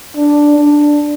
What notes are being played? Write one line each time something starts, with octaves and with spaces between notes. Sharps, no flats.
D4
D4